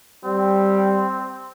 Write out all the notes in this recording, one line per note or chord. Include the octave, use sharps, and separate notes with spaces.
G3 C4